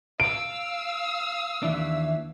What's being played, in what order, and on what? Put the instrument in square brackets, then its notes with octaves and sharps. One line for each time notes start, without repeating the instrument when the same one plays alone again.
[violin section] F5 E6 [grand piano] D7
[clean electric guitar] D#2 E3 D4 [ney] E5